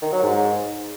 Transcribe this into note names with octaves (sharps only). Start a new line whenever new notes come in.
D#3
F#3
G#2